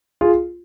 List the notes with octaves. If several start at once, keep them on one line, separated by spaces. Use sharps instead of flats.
F4 G#4